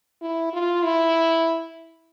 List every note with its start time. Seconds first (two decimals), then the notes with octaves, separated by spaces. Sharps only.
0.22 E4
0.53 F4
0.83 E4